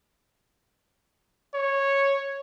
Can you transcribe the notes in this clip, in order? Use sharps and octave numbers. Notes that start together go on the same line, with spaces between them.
C#5